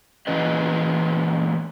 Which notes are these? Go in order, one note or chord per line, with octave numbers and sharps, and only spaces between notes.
A#2 E3 C#4 G#4 B4 D#5